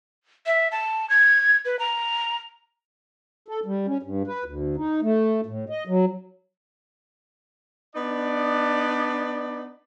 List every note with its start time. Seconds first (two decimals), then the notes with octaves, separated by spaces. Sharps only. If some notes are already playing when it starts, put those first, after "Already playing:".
0.46 E5
0.72 A5
1.10 G#6
1.65 B4
1.79 A#5
3.48 A4
3.66 G3
3.87 C#4
4.03 G2
4.27 B4
4.44 D2
4.77 D#4
5.02 A3
5.46 A2
5.70 D#5
5.87 F#3
7.95 B3 D4 D#4 D5